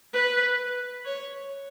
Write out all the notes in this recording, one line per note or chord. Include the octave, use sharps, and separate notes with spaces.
B4
C#5